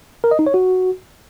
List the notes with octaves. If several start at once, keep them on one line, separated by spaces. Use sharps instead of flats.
A#4
D#5
D#4
C#5
F#4